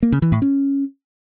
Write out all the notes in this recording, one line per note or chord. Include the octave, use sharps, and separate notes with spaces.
A#3
C#3
E3
A2
C#4